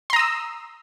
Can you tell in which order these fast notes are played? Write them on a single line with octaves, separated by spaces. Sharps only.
C6 A#5 D#6 E6